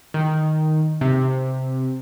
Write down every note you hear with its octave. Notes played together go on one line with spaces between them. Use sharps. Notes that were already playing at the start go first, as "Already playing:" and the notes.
D#3
C3